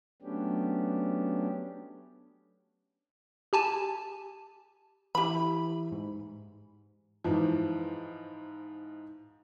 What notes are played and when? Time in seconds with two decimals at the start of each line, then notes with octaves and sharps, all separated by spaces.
0.22 F#3 A3 B3 C#4 D4 G4
3.53 G4 G#5 A5
5.15 E3 E4 G4 B5
5.92 G#2
7.24 G#2 E3 F3